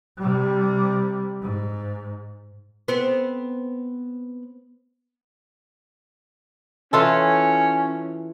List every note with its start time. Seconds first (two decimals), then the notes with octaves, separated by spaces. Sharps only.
0.18 C3 G3
1.42 G#2
2.88 B3 C4
6.93 E3 C#4 F4 A4